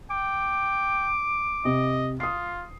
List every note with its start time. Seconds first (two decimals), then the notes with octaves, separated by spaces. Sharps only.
0.11 G5 D6
1.65 C3 D#5
2.20 F4 D#6 C7